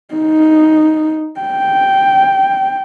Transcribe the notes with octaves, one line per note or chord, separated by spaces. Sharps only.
D#4
G5